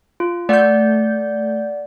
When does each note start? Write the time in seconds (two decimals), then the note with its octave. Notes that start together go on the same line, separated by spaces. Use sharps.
0.20 F4
0.49 A3 D5 F#5 G6